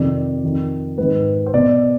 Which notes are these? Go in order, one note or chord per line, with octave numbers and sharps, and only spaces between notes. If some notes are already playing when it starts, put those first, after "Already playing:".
Already playing: F2 C3 D#3 D5
F2 D#3
G#2 D#3 B4
C5
B2 D5